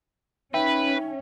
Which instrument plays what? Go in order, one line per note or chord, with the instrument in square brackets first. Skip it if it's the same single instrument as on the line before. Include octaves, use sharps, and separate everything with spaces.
[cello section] C#4 [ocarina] D#4 [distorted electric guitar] B4 [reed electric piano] E5 G5